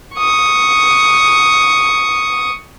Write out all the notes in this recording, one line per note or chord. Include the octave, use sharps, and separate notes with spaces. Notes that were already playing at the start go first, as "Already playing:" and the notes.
C#6 D#6